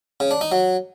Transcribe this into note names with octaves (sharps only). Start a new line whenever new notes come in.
C#3
D4
D#4
F#3